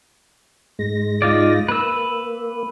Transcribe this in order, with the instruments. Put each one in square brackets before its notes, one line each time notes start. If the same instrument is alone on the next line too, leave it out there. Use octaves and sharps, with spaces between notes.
[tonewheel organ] G#2 G#3 A#6
[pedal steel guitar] D#4 F4 D5
[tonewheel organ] A#3 [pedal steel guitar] B4 E6